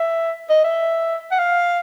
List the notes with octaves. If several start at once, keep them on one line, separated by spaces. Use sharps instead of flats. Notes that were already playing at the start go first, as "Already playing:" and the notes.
Already playing: E5
D#5
E5
F#5
F5